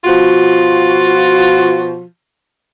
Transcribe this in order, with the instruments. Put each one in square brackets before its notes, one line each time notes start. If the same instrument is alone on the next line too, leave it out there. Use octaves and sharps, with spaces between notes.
[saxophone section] B2 F3 F4 F#4